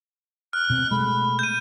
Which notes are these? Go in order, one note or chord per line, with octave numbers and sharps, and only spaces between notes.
F6 F#6
B2 C4
B2 G#3 A3 B5
G6 D#7